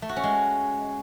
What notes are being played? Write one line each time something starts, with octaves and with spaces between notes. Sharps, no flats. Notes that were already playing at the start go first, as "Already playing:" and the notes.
A3
F#4
C#4
G#3